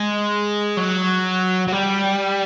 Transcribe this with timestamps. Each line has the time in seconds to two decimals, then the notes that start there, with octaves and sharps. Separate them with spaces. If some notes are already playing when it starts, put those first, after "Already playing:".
Already playing: G#3
0.77 F#3
1.68 F#3
1.72 G3